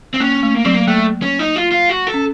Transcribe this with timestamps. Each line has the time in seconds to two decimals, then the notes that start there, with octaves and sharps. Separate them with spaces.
0.14 C4
0.20 A#3 C#4
0.43 A3
0.55 A#3
0.65 F#3 C4
0.74 A#3
0.88 A3 A#3
1.22 C#4
1.39 D#4
1.56 F4
1.72 F4
1.89 F#4
2.07 A4
2.14 C#4